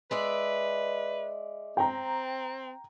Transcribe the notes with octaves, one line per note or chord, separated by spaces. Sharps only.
G#3 B4 D5 E5
C4 G5 A#5